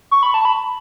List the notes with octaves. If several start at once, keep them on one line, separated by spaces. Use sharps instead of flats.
C#6
B5
A5
B5